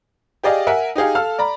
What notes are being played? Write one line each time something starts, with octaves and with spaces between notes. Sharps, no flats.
G4 G#4 D5 D#5 F5
A#4 E5 F#5 G#5
D#4 G4 G#4 F5
A4 F5 E6 F6
D5 A#5 B5